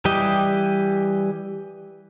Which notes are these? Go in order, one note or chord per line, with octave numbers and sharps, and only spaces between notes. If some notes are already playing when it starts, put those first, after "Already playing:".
E3 G3 G4 D#5